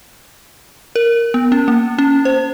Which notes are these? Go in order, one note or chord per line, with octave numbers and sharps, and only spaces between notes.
A#4
B3
C#4
A#3
C#4
C5